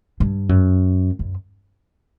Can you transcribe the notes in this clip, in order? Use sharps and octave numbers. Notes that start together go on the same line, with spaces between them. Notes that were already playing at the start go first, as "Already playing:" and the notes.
G2
F#2
F#2